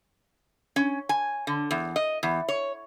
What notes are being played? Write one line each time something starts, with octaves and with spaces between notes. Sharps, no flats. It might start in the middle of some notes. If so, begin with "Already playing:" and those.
C#4
G#5
D3
E2
D#5
E2
C#5